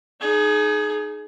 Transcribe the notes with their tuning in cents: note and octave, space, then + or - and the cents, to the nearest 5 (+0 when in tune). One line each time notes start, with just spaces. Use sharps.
D#4 -15 G#4 +25